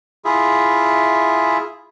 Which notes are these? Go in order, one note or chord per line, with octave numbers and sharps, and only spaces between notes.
E4 F4 G#4 E5